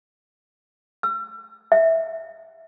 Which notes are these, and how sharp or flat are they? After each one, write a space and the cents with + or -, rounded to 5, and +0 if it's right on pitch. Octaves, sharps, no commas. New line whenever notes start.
E6 +45
E5 -15